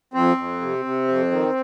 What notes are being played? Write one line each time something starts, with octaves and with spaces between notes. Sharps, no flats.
F2 C4
F2
C3
C3
F2
D#3